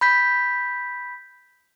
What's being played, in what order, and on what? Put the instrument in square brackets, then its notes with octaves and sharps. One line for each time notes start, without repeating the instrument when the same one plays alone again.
[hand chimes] B5 G6 B6